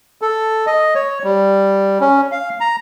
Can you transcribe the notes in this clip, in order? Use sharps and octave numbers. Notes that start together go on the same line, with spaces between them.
A4
D#5
C#5
G3
C#4
F5
A#5